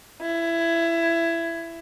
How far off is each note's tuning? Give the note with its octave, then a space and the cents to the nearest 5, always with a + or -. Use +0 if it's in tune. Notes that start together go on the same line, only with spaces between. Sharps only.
E4 +20